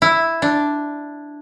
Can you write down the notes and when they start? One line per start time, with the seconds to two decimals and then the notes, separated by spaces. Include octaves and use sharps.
0.02 E4
0.42 D4